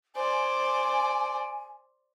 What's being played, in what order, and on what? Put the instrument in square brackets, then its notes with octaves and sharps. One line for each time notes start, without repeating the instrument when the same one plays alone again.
[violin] C5 D5 [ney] G#5